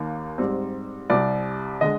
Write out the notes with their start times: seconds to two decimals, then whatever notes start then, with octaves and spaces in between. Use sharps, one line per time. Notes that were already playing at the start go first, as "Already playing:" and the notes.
Already playing: D#2 D#3 A#3
0.38 G#2 G3 C4
1.10 C2 C3 G3 D5
1.81 D3 G#3 D#5